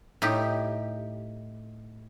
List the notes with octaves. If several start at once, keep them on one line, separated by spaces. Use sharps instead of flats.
A2 D#4 G4